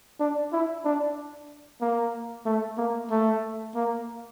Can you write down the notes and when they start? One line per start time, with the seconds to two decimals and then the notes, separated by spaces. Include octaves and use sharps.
0.20 D4
0.52 E4
0.85 D4
1.81 A#3
2.46 A3
2.77 A#3
3.10 A3
3.75 A#3